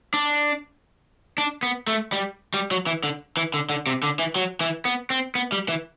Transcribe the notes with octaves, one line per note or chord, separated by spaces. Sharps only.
D4
D4
B3
A3
G3
G3
F#3
E3
D3
E3
D3
D3
C3
D3
E3
F#3
E3
B3
C4
B3
G3
E3